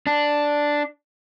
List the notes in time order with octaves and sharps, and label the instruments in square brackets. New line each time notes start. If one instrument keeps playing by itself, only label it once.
[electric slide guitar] D4